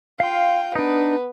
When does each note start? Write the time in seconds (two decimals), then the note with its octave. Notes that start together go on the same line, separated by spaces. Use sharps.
0.20 F4 F5 G5 C6
0.75 B3 D4 D#4 B4